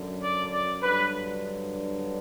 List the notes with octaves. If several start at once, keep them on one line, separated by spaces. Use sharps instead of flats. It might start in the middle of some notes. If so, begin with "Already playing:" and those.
Already playing: F#2 D3 F#3
D5
D5
G2 D3 F#3 B4